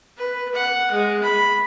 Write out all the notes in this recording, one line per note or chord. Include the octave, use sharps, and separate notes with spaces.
B4
F#5
G#3
B5